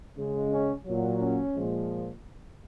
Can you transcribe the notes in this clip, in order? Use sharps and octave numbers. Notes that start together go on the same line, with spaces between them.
C#3 G#3
C#4
A#2 F#3
C#4
A#2 F3 G#3